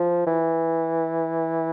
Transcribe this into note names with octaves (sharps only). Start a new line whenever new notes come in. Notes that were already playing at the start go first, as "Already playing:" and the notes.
Already playing: F3
E3